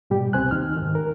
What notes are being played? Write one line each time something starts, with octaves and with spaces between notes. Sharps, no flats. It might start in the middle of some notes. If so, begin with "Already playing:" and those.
G#2 B2 G3 G4
C2 C4 C5 G#5 F#6
D#2 D#4 F6
G#2 D#3
A#4